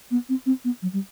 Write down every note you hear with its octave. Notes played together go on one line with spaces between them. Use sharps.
B3
C4
C4
B3
F#3
G3